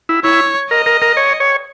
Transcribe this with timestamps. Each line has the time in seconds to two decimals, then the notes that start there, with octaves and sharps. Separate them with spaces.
0.09 E4
0.24 E4 C#5
0.70 A#4 D#5
0.86 A#4
1.02 A#4
1.17 C#5
1.40 C#5